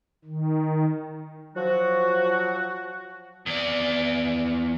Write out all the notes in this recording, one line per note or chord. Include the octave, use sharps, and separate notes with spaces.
D#3
F3 F#3 F#4
E2 D5